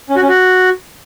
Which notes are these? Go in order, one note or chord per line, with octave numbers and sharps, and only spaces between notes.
C#4
F#4
C#4
F#4